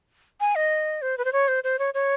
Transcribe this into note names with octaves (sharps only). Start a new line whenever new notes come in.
G#5
D#5
C5
B4
C5
C#5
C5
C5
C#5
C#5